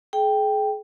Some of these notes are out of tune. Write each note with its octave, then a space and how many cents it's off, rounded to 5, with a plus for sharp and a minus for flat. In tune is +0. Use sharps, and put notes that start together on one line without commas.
G#4 +35 G5 +0